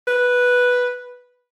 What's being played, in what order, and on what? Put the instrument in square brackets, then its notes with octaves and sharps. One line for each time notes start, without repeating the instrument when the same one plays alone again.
[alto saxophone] B4